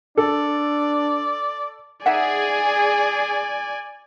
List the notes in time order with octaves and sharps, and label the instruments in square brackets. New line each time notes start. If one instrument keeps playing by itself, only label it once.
[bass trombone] D4 [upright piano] A4 [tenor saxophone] D5
[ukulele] D#4 E5 F#5 [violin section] G#4 [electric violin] D5 G#5